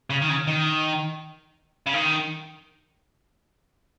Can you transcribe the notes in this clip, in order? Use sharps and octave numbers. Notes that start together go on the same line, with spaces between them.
C#3
D#3
C#3
D#3
C#3
D#3